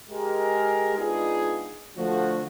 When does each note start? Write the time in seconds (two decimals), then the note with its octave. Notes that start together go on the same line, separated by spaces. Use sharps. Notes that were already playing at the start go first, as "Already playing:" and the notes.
0.10 G#3 G4 G#4 A#4
0.97 G#3 B3 D4 D#4 F4 G#4
1.97 D3 F3 A3 F#4